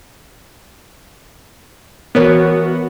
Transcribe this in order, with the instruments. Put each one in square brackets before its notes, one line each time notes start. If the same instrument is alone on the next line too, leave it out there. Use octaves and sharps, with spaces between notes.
[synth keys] E3 B3 [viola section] F#4 [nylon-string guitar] A#4 C#5